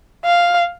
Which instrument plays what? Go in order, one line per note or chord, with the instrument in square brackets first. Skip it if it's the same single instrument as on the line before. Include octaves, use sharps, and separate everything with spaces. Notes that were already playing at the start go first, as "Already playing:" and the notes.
[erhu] F5